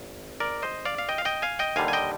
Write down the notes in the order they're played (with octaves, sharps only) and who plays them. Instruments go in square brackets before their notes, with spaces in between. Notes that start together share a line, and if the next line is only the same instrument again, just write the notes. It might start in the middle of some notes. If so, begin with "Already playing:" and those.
Already playing: [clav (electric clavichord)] G#1
A#4 D5
C5 D#5
D5 F5
F5
D#5 G5
F5
D#5 G5
F5 G#5
D#5 G5
D#2 D3 G3 F5 G#5
G#5
D#5 G5